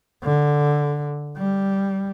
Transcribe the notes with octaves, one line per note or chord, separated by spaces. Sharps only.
D3
G3